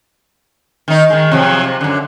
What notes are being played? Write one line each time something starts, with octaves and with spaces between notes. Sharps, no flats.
D#3 D#4
D#3 G#3
C3 F3 F#3
C3
F#2 D3